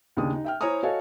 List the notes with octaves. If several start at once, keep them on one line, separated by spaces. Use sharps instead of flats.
D#2 C#3 D4 D#6
D#4
E5 G5 F6
E4 C5 C#5 G#5 A#5 D#6
F#4 A4 C#5 D#5 F5 G#5